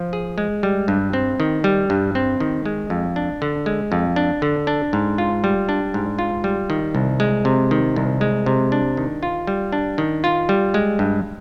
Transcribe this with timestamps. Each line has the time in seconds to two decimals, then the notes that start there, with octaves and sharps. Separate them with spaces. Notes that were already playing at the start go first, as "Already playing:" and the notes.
Already playing: F3
0.13 G#4
0.38 G#3
0.63 G3
0.88 G2
1.13 C4
1.40 D#3
1.64 G3
1.90 G2
2.15 C4
2.40 D#3
2.66 G#3
2.90 F2
3.16 D4
3.42 D3
3.66 G#3
3.92 F2
4.16 D4
4.42 D3
4.67 D4
4.93 G#2
5.18 F4
5.44 G3
5.69 D4
5.94 G#2
6.19 F4
6.44 G3
6.70 D#3
6.95 C2
7.20 G#3
7.45 C3
7.71 D#3
7.96 C2
8.21 G#3
8.46 C3
8.72 D4
8.97 D#3
9.23 F4
9.47 G3
9.73 D4
9.98 D#3
10.24 F4
10.49 G3
10.74 G#3
10.99 G2